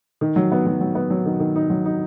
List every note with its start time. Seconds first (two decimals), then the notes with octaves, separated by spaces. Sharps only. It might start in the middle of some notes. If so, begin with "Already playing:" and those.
0.21 D#3
0.36 F#3
0.52 B3
0.66 F#3
0.81 F#3
0.95 B3
1.10 F#3
1.26 D#3
1.40 D#3
1.55 D#4
1.70 F#3
1.85 D#4